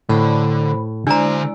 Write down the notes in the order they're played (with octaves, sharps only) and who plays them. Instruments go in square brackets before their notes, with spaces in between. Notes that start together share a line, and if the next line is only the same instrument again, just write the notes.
[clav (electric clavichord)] A2 [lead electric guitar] D3 [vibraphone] C5 B5
[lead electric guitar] D3 C5 [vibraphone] G#3 E4 D5 [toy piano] D4 A#5